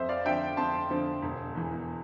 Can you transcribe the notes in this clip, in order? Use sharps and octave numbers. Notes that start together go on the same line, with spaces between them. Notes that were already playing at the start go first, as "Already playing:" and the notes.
Already playing: F2 C5 E5
D5 F5
D3 F3 C4 E5 G5
F2 A5 C6
D3 F3 C4
E1
E2 E3